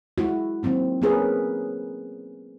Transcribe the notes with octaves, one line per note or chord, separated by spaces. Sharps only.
G#3 E4 F#4
D#3 F#3 A#3 C4 D#4
A#3 B3 C#4 G#4 A#4 B4